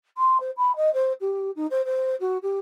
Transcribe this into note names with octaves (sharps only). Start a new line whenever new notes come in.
C6
C5
B5
D#5
C5
G4
D#4
C5
C5
F#4
G4